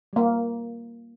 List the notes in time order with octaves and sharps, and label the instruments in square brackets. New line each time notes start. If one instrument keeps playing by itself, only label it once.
[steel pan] G3 A#3